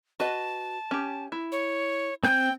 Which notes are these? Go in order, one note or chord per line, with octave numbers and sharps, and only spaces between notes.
F#4 B4 D#5 A5
C#4 G4
E4
C#5
C4 G5 G#5 G6